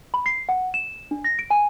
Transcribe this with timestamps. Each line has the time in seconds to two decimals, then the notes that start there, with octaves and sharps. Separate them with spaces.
0.14 B5
0.26 C7
0.49 F#5
0.74 E7
1.11 D4
1.24 A#6
1.39 D7
1.50 G#5